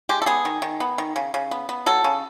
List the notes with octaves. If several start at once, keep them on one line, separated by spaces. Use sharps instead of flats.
G#3 G4
A4
B3 G#4
D#3
D#3
B3
D#3
C#3
C#3
B3
B3
F#3 A4
C#3